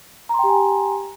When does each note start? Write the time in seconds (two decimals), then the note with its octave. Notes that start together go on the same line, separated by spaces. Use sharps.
0.29 A#5
0.34 C6
0.39 G5
0.44 G4
0.48 G#5